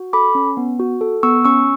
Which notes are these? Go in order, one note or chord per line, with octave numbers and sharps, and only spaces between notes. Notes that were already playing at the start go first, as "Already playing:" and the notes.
Already playing: F#4
A4 B5 D6
C#4
B3
F#4
A4
B3 C#6 E6
C#4 C#6 E6